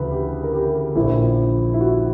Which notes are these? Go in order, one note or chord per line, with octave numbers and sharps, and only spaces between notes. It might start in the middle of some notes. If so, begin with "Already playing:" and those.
Already playing: D2 C#3 E3 B4
G4
A#4
G4
A#1 A#2 E4
E4
F#4